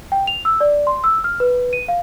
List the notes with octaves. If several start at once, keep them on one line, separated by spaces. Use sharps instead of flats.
G5
F7
E6
D5
C6
E6
F6
B4
D#7
F5